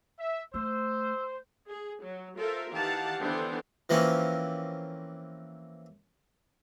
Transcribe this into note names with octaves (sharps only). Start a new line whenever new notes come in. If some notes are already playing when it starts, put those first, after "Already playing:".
E5
A3 C5 E6
G#4
F#3
F4 A4 A#4 C5 E5
D#3 E3 G4 F5 F#5 A5
D3 E3 B3 D4 C5 G5
E3 F3 A#3 C4 C#4